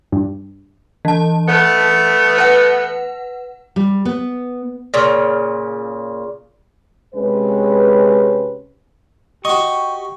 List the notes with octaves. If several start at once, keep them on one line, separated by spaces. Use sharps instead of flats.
G2
E3 A5
A3 B3
B4 F#5
G3
B3
A#2 C#3
C3 G#3 C#4 B4
F#4 G4 D#5 C#6